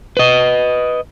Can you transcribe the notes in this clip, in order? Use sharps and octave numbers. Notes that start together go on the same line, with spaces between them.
B4 D#5